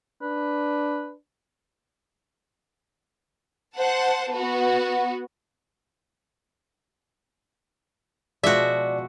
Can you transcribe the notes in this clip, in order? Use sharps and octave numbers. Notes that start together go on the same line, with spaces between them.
D4 B4
C5 F#5 A5
B3 F#4
B2 F3 G#3 F#4 D5 E5